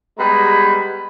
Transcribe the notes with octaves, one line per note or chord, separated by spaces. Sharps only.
G3 G#3 B3 B4 A#5 B5